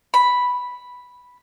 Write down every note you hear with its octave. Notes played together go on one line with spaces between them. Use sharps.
B5